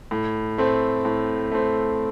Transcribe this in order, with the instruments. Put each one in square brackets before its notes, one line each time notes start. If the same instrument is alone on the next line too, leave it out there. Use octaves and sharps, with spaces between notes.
[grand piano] A2
A3 C4
A2
A3 C4